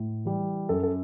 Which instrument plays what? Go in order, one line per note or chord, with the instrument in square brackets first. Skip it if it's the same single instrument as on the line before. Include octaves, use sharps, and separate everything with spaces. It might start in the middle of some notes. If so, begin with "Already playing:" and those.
Already playing: [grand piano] A2
E3 G3
F#2 A4
A4